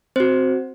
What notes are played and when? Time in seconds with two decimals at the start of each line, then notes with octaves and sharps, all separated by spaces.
0.16 C4 F#4 C5